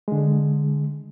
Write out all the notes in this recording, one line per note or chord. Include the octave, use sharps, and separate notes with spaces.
D3 G#3